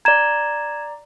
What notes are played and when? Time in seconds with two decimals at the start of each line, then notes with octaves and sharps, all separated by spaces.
0.05 D5 A#5 G#6 E7